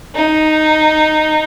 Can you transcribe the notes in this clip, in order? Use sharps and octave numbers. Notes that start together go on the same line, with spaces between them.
D#4